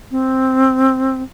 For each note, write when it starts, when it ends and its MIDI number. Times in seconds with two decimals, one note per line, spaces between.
0.11 1.22 60